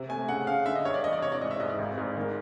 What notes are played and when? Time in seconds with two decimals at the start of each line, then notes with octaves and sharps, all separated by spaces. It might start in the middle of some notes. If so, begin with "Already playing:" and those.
Already playing: C3
0.09 A3 G#5
0.28 C#3 F#5
0.47 C#3 F5
0.66 D3 E5
0.75 D#5
0.85 G2 C#5
0.94 D5
1.04 E2 D#5
1.13 D5
1.22 C3 C#5
1.32 D5
1.41 G#2 D#5
1.51 E5
1.60 G#2 D#5
1.69 D5
1.79 G#1
1.98 G#2
2.17 D#3